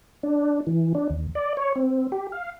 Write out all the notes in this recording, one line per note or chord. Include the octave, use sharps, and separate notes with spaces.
D4
E3
D4
D#2
D5
C#5
C4
G4
F5